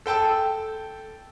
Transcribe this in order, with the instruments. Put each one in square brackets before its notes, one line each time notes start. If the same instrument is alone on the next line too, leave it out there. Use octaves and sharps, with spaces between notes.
[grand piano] A4 G5 A5 E6